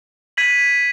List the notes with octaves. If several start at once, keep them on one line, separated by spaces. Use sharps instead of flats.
G#6 B6 D#7 F#7